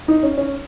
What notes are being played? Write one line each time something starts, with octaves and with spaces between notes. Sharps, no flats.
D#4
C#4
C#4